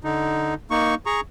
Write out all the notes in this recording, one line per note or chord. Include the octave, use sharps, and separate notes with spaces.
D3 D#4
A#3 D#4 C#6
G#4 A#5 C#6